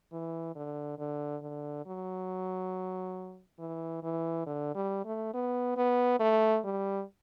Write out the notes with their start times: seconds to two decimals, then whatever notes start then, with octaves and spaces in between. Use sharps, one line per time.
0.12 E3
0.55 D3
0.98 D3
1.42 D3
1.86 F#3
3.59 E3
4.03 E3
4.46 D3
4.75 G3
5.05 A3
5.34 B3
5.77 B3
6.20 A3
6.64 G3